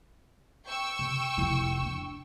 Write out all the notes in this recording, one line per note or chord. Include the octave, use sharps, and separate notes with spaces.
G5 C#6 E6
C3
F1 E4
D4